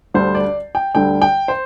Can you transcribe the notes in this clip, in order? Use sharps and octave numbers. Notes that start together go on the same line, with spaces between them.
D2 D3 G3 C5
D5
G5
D2 D3 G3 G5
G5
C5